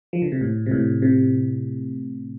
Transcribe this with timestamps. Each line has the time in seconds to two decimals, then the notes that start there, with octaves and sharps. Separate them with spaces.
0.13 F3
0.22 D3
0.32 C3
0.41 A2
0.66 C3
0.71 A2
1.02 C3